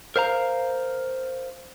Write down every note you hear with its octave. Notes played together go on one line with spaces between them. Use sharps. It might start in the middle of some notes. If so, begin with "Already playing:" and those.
A#4 C5 F5 A#5